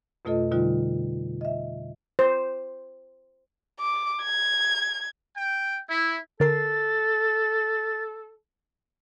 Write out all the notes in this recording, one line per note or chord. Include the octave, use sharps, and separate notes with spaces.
F2 B2 A3 F4 A4 D#5
B2 D3 G3 D#4 F4
D#5 E5
C5
D6
G#6
G5
E4
D3 A4 A#4 A6 C7